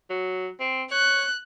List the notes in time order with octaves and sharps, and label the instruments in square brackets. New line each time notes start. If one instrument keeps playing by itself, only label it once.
[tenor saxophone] F#3
C4
[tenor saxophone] C#5 [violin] F#6